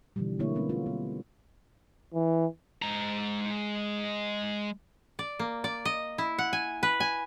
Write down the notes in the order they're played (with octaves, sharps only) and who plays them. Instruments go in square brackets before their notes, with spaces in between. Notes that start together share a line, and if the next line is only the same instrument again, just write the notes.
[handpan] B2 D3 E3 F3 G3
D3 A3 A#3 E4 C#5
G3 G#3 B3 C#4
F4
G3 B3
[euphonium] E3
[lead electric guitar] G#3 A#5
[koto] D5
A#3
D5
D#5
E4
F#5
G#5
B4
G#5